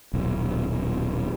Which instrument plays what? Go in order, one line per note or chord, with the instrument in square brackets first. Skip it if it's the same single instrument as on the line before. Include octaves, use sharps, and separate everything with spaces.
[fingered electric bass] D#1 B1